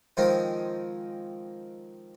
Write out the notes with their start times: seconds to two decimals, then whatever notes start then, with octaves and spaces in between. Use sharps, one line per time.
0.17 D#3 F3 G#3 C4 D#4